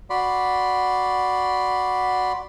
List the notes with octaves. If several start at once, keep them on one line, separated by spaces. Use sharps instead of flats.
F#4 D5 B5 C6